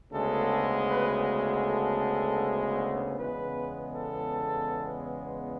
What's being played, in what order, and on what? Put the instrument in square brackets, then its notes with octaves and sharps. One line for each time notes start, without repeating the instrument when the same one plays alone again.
[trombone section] D2 C#3 G#3 B3 A4
B4
A4
E2 C#3 G#3 B3 B4
A4